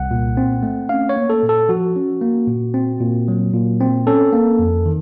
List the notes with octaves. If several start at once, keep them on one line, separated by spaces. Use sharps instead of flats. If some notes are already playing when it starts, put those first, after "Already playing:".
Already playing: C2 F#5
A#2
C4
A3
C#4 F5
C#5
A#3
A4
A#2
A4
F3 F#4
C#4
A#3
A#2
C4
A#2
F#3
A#2
C4
C#4 A4
A#3
F2
D#3